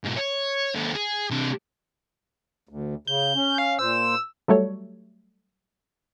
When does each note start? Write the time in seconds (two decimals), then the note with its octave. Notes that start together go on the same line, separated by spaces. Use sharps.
0.04 G#2 B2
0.16 C#5
0.76 D#2 A4
0.95 G#4
1.31 C3 D4
2.69 D2
3.07 C#3 G6
3.35 C#4
3.58 F5
3.79 A#2 C5 E6
4.48 F#3 G3 A3 A4 C#5